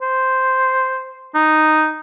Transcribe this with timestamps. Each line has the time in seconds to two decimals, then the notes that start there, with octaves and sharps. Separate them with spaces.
0.02 C5
1.35 D#4